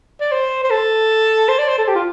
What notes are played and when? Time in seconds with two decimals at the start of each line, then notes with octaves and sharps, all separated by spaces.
0.21 D5
0.32 C5
0.64 C5
0.70 A4
1.48 C5
1.59 D5
1.68 C5
1.78 A4
1.88 G4
1.95 F4